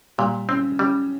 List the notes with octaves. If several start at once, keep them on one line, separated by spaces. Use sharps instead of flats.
A#2 G3
C#3 C4
C#3 G3